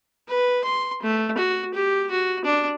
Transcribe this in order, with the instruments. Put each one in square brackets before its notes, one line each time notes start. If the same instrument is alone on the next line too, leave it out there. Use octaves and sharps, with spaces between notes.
[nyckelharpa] B4
C6
A3
F#4
G4
F#4
D4